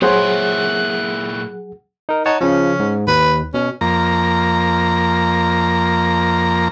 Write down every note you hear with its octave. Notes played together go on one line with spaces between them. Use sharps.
A#2 F#3 E4 G#4 C5 C#5 F#5 F#6
D#4 A#4
D#4 C#5 F#5 A5
C#3 F3 C#4
G#2
D#2 B4
B2 C#4
F2 A#3 A#5